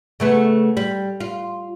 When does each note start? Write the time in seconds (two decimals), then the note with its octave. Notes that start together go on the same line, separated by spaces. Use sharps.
0.20 C#3 A3 B3
0.77 G3
1.20 F4